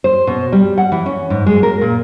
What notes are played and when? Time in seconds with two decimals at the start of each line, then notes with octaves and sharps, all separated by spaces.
0.04 C5
0.27 B2
0.52 G3
0.78 F#5
0.92 E3
1.06 C#4
1.30 G#2
1.46 G#3
1.63 A#4
1.81 A#2